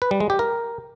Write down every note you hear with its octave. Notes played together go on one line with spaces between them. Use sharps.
B4
G3
G#3
G4
A#4